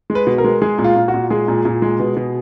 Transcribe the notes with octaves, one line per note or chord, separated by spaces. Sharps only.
G#3
B4
B2
A#4
G#3
G#3 G#4
A#2
F4
A#2
F#4
A#2
G#3 G#4
A#2
A#2
G#3
B2
B2